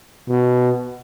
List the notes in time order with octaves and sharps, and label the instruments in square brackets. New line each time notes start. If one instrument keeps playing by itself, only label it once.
[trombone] B2